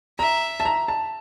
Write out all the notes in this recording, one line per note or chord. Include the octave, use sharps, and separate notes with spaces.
E5 A#5
A5
A#5
A5